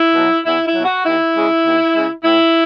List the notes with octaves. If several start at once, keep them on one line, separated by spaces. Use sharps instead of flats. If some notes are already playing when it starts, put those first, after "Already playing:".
Already playing: E4
B2 F#3
E2 E4
E4
B2 F#3
F#4
D#2 E4
C#3 G#3
D#2
C#3 G#3
A2 E4